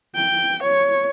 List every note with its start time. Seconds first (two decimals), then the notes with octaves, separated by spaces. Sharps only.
0.15 G5
0.63 C#5